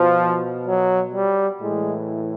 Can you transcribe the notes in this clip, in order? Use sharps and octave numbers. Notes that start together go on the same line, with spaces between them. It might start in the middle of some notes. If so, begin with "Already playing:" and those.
Already playing: B2 F3
F#3
G3
A2 E3 G#3